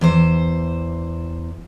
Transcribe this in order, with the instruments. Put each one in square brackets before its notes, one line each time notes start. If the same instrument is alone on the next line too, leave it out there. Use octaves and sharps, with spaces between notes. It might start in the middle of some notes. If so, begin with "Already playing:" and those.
[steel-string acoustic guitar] E2 E3 C5